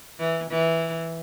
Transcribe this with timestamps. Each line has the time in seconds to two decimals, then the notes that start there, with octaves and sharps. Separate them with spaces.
0.19 E3
0.50 E3